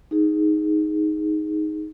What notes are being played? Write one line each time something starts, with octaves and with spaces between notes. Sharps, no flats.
D#4 G#4